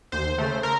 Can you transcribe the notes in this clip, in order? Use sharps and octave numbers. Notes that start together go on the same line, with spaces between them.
D#2 C5
C#3 A3
A#4